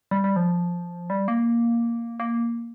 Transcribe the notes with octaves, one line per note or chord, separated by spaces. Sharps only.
G3
G3
F3
G3
A#3
A#3